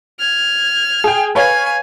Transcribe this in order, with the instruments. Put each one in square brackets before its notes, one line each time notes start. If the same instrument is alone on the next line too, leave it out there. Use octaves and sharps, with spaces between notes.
[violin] F6 G#6
[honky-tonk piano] G#4 G5
[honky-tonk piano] B4 C#5 F5 [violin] G#5